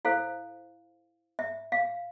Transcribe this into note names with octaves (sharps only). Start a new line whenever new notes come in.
E4 A4 C5 F5
E5
F5